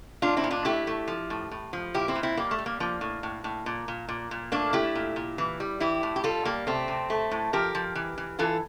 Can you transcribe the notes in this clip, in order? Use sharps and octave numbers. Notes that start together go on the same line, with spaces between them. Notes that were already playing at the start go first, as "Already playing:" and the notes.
A#2 D4 F4
C4 E4
A#2
D4 F4
A3 E4 G4
A3
F3
A2
A2
F3
A#2 E4 G4
C4 E4
A#2
C4 E4
G3 A#3
A3
G3
A#3
F3 A#3
A2
A2
A2
A#2
A#2
A#2
A#2
A3 A#3 D4
A3 E4 G4
A#2
A#2
E3
G3
E3 E4 G4
A2
G4
G3 F4 A4
G3 A#3
C3 A3 C4
C3
A3
A2
F3 G4 A#4
F3
E3
E3
E3 F4 A4